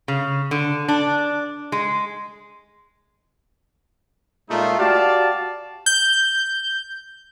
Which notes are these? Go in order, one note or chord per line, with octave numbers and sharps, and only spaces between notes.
C#3
D3
D4
G#3
A#2 G#3 A3 D#4 F4
F#4 G4 D5 F5 A5
G6